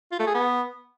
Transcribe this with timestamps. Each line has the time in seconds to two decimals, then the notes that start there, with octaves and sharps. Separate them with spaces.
0.12 F4
0.19 A3
0.27 G#4
0.34 B3